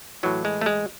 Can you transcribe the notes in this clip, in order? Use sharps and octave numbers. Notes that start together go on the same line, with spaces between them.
A2 E3 F#3
G#3
A3
G#3